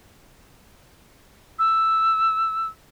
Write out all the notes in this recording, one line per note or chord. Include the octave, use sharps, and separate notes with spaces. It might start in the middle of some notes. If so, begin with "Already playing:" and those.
E6